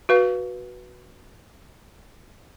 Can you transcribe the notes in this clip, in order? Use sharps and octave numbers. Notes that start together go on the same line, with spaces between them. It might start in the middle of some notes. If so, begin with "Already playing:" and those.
F#4 B4 F5